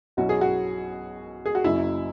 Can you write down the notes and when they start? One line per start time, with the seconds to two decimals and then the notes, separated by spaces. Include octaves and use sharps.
0.17 B1 B2 F#3 C#4 E4 F#4
0.29 G#4
0.41 F#4
1.46 G#4
1.55 F#4
1.64 F#1 F#2 C#3 F#3 E4